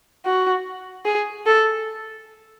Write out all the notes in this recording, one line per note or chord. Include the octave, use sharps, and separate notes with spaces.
F#4
G#4
A4